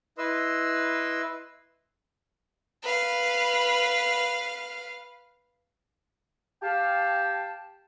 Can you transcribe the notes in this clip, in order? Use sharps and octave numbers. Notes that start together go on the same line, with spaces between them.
E4 B4 D#5 C6 E6
B4 F5
G4 F5 G5 A5